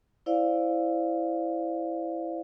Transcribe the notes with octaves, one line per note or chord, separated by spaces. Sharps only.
E4 C5 D5 F5